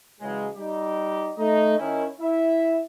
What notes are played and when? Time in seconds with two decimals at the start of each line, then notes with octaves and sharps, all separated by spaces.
0.20 C#3 E3 F#3 G#3
0.55 G3 D#4 G4
1.37 A3 D#4
1.77 D#3 C#4 E4
2.20 E4 E5